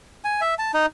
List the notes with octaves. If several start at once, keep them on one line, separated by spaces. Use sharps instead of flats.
G#5
E5
A5
D#4